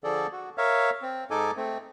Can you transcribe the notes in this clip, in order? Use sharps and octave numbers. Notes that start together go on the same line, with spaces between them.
D3 F3 G#4 A4 D5
F#4
A#4 C#5 E5 F5
C4
G#2 D#4 A4 G#5 D6
A3 C4